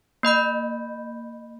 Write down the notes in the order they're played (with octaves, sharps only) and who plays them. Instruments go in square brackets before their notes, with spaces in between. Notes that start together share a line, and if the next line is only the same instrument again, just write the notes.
[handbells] A#3 D#5 B5 G6